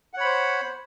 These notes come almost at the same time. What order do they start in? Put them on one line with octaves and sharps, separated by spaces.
F#5 C#5 B5 C5